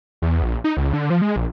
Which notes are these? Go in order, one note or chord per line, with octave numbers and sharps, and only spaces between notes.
E2
A#1
D#4
C#2
D3
F3
G#3
A#1